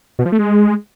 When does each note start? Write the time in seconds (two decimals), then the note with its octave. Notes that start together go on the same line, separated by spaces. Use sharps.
0.19 B2
0.26 F3
0.32 A3
0.39 G#3